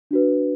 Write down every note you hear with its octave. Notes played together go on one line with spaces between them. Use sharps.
D4 F#4 B4